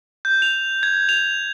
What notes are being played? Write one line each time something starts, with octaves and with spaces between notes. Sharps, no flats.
G6
F7
G#6
F7